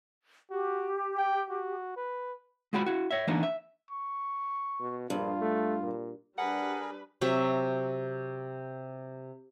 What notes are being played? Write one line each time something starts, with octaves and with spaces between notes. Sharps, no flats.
F#4 G4
G5
F#4
B4
G#3 F4 F#4 G5 B5
E4 F#4
C#5 E5
E3 A#3 B3 D4 D#4
E5
C#6
B2
A#1 G2 F4
A3
A#2
G3 D4 G#4 A#4 B4 F#5
C3 F#3 E5